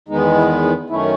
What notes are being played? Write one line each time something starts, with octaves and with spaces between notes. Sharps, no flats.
E2 D#3 G#3 B3 D#4
E4
D#4
F#2 D#3 A3 C#4 E4